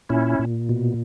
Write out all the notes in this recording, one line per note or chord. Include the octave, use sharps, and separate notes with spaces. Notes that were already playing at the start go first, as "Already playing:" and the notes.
A#2 C#4 E4
A#2
B2